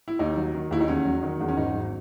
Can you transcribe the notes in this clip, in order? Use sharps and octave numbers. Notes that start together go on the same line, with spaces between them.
E4
D#2 D#4
F#3
D#3
D#2 E4
D#4
E2 C#4
F#3
D#3
E2
C#4
G#1 D#4
F#3